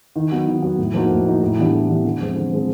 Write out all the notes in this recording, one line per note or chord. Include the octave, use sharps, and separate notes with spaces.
D#3
F#3 B3
D#3
F#3 B3
A2
F3 A#3 D#4 F#4
A2
F3 A#3 D#4 F#4
A2
E3 G3 B3 D4
A2
E3 G3 B3 D4
D3
F3 G#3 C4
D3
F3 G#3 C4